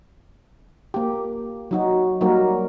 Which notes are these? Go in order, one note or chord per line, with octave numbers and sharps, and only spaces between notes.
A#3 G4
F#3 D#4 F#4
F#3 G3 A#3 D#4 F#4 A#4